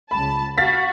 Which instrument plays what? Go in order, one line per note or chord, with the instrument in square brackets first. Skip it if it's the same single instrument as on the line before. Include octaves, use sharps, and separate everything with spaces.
[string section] C#2 A5 [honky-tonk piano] B5
[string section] F#4 [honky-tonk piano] F5 A6 B6